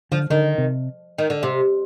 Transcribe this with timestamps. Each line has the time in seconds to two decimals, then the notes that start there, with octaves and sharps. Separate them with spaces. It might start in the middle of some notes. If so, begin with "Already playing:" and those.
0.12 D3 F3
0.30 D3 D#3
0.58 C3
1.18 D#3
1.30 D3
1.43 C3